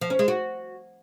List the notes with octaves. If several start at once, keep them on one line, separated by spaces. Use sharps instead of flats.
F3
C#4
G#3
F#4